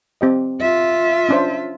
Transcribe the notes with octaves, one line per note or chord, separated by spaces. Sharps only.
C4 G4 D#5
F4 E5
C#4 D4 C5